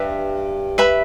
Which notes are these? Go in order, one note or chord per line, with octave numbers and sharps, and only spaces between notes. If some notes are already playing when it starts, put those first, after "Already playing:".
Already playing: G2 B4 E5
B4 E5 B5